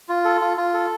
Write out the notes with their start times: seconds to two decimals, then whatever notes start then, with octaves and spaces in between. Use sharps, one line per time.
0.09 F4
0.25 A4
0.41 F4
0.57 F4
0.74 A4